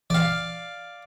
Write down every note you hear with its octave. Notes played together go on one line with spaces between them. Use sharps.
D5 F5